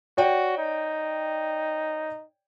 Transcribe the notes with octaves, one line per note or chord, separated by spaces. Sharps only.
F#4 C#5 D5 G5
D#4